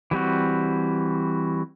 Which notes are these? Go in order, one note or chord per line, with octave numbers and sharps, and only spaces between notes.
E3 G3 C4 F#4